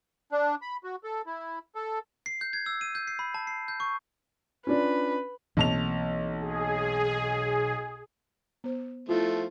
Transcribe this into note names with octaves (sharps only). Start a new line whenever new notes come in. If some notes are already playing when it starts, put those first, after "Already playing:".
D4
B5
F#4
A4
E4
A4
C7
G6
G#6
E6
D#7
G6
C7
B5
A5
C7
G6
C#6
C#4 D4 F4 B4
B1 E3 A#3 C4 A5 F7
G#4
B3 C5
F3 A3 E4 F4